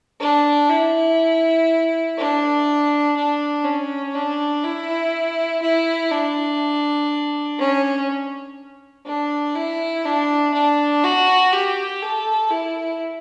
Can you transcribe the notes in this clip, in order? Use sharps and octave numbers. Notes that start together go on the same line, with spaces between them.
D4
E4
D4
D4
C#4
D4
E4
E4
D4
C#4
D4
E4
D4
D4
F#4
G4
A4
E4